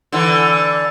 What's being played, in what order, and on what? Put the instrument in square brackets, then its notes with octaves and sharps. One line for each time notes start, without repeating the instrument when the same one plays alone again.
[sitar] D3 E3